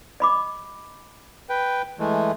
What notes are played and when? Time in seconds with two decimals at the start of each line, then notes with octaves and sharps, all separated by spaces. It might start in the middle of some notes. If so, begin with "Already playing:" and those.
0.20 D#5 B5 D6
1.49 B4 G5
1.99 E3 G#3 A3